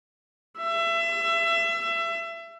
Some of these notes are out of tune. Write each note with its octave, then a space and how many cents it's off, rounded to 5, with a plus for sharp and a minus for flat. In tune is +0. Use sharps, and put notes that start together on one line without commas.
E5 +30